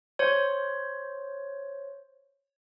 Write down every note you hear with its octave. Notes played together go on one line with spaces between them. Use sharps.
C5 C#5